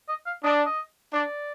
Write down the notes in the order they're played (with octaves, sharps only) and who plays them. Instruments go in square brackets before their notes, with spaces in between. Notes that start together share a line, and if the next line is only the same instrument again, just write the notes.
[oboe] D#5
F5
[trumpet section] D4 [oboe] D#5
[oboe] D5
D#5
[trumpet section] D4 [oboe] D5